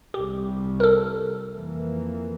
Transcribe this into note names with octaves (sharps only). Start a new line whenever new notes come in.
C2 C3 G3 G4
A#4
A4
F2 E3 A#3